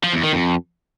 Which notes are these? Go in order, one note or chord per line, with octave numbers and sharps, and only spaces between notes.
F3
E2
D#3
F2